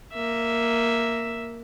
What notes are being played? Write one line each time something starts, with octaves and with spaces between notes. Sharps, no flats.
A#3 E5